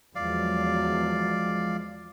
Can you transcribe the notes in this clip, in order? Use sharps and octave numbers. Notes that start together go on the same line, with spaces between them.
E2 F3 F#3 G#3 D5 F5